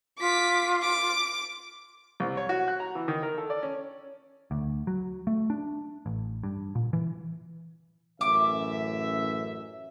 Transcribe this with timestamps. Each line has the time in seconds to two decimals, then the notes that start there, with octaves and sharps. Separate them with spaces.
0.20 F4 D6 B6
0.82 D6
2.20 C2
2.37 C#5
2.49 F#4
2.68 F#6
2.80 A#5
2.95 E3
3.08 D#3
3.23 A#4
3.38 A4
3.50 D5
3.63 C#4
4.51 D2
4.87 F#3
5.27 A3
5.50 D4
6.06 A1
6.43 G2
6.75 A#2
6.93 E3
8.21 A1 F#2 E5 D6